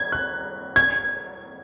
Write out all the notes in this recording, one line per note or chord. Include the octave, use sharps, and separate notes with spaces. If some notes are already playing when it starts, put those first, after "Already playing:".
Already playing: G#6
F#6
G#6